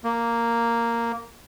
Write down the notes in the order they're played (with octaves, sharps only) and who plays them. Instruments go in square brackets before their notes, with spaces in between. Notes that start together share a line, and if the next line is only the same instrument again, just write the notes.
[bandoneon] A#3